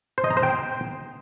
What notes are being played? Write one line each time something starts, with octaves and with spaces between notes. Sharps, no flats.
C5
D#5
A#5
C5
G5